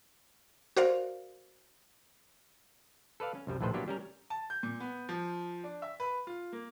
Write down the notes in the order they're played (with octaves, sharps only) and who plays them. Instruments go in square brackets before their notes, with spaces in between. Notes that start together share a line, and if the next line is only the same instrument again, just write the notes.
[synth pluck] F#4 A#4 C5 D5 F5
[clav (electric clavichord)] A4 B4 D5 F5
C#4
C2 F#2 G3
A#1 D#2 A2 A3 B4 C5
F#3 A#3 B3 D4 E4 G4
G3 C#4 A#4
[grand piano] A5
G6
A#2
B3
F3
D4
E5
B4
F4
A#3